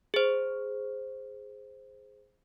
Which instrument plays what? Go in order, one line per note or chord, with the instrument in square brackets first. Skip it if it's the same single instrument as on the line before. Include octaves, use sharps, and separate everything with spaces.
[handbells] G#4 C5